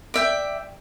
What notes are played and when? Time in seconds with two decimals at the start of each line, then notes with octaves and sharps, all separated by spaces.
0.14 D5 E5 G5